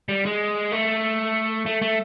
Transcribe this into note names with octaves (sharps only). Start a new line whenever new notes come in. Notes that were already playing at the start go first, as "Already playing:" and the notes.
G3
G#3
A3
A3
A3